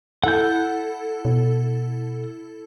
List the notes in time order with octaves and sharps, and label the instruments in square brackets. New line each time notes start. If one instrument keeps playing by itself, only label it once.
[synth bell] E4 A4 [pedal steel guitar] F#5 G6
[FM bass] B2